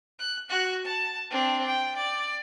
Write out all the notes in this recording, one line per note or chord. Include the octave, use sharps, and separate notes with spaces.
F#6
F#4 F#6
A5
C4 D4
G5
D5